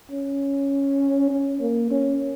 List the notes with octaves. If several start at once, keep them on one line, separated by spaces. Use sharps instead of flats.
C#4
C#4
A#3
C#4